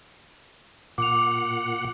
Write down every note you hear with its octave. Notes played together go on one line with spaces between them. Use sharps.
A#2 F#5 D6 F7